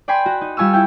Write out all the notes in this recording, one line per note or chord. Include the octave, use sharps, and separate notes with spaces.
D5 G5 G#5 B5 C6
F#4
D#4
G3 F4 G#5 C#6 E6
E4 G5